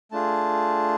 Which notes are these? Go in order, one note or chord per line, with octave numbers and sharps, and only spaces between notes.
A3 D4 F4 G#4 A5